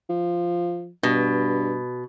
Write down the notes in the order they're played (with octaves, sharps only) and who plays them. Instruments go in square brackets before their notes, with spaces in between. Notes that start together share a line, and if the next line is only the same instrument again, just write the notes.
[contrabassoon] F3
[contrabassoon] G2 [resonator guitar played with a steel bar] B2